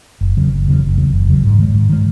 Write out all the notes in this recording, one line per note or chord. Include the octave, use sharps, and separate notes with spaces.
F#1
E2 C#3 F#3
F#1
E2 C#3 F#3
F#1
E2 C#3 F#3
F#1
E2 C#3 F#3
G#2
D#3 G#3
G#2
D#3 G#3